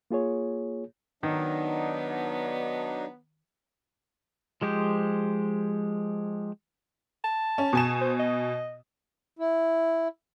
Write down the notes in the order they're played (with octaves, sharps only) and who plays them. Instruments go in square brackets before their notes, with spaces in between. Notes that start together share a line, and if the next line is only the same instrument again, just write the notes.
[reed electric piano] A#3 F4 G#4 C#5
[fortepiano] D#3 [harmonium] F#3 D4 D#4 [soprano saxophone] B3
[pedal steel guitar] F3 G#3 G4 C5
[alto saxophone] A5
[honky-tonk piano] C#4
B2 G#5 E7
[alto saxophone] C5
D#5
[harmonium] E4